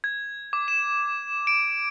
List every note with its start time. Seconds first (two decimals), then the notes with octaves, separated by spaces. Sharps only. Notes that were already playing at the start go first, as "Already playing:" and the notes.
0.04 G#6
0.53 D6
0.68 E7
1.47 D7